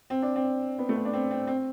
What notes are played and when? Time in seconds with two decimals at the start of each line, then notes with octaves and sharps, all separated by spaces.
0.10 C4
0.22 D4
0.36 C4
0.79 B3
0.89 A3
0.96 B3
1.05 D4
1.13 C4
1.31 C4
1.47 C4